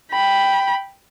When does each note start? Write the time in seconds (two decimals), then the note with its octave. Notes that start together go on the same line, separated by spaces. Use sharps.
0.12 G5 B5